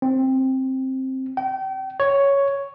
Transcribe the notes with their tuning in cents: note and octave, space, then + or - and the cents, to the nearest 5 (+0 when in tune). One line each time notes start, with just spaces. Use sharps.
C4 +10
G5 -35
C#5 +5